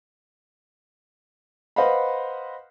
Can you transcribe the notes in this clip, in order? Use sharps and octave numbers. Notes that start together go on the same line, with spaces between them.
B4 C5 D#5 F5 F#5 B5